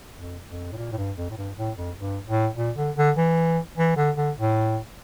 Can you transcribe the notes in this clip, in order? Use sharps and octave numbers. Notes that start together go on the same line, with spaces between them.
F2
F2
A2
A#2
A2
G2
F2
A2
G2
A2
F2
G2
A2
A#2
D3
D3
E3
E3
D3
D3
A2